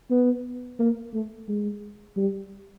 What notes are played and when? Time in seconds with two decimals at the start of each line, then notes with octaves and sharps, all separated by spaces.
0.10 B3
0.79 A#3
1.13 A3
1.48 G#3
2.17 G3